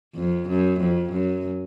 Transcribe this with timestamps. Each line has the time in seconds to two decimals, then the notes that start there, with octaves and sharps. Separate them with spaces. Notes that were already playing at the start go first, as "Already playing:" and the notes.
0.16 F2
0.48 F#2
0.80 F2
1.13 F#2